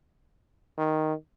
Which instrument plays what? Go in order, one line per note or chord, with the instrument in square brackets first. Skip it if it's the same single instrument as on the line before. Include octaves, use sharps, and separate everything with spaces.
[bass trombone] D#3